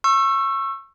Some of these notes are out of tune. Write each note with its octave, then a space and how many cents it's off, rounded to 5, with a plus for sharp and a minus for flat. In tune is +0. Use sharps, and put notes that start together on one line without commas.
C#6 -20 E6 +20